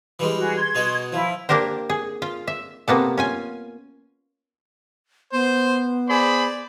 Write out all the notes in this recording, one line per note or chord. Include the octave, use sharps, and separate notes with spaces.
E3 G3 G#3
F#4 G#4
C6 G#6
B2 D#4 F#4
F3 E4
A#3 D4 G4 A#4 C5
G#4
F4
E5
C3 A#3 B3 A4
C#4 F4 G#5
B3 C5
G#4 C5 D5 B5